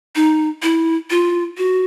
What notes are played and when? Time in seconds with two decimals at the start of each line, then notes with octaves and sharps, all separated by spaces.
0.16 D#4
0.62 E4
1.10 F4
1.57 F#4